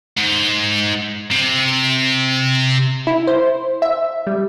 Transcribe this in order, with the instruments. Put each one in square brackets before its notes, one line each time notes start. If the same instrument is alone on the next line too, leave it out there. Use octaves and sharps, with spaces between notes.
[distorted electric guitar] G#2
C3
[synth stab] E4
C5
E5
G3